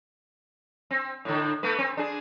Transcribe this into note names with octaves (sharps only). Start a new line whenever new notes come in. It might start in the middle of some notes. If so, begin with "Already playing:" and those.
C4
A2 D3
A3 B3 B4
C4
D4 G#4